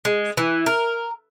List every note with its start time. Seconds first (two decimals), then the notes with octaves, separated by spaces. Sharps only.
0.05 G#3
0.37 E3
0.66 A#4